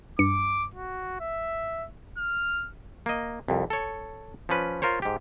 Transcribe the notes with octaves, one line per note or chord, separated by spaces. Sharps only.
G2 D6 C#7
F#4
E5
F6
A#3 D#5
C2 F2
A4 C#5
F3 C#4 B4
F4 A#4 C5 C#5
G#2 G4